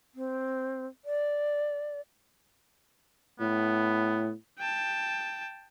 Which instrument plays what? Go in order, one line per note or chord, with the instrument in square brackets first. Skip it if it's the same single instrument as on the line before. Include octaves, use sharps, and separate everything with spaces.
[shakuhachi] C4
D5
[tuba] A2 [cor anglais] B3
[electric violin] G5 A5